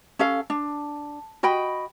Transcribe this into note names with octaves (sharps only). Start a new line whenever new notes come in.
C#4 A4 F5
D4
F#4 D#5 G5 B5